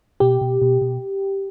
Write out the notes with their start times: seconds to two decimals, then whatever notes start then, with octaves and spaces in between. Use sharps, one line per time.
0.20 B2 G4
0.41 B2
0.62 B2
0.82 B2